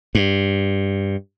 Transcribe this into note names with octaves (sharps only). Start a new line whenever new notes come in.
G2